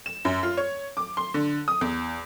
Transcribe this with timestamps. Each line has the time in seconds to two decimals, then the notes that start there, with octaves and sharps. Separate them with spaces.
0.06 E7
0.25 F#2
0.43 F4
0.57 C#5
0.97 D6
1.17 C6
1.34 D3
1.68 D#6
1.81 E2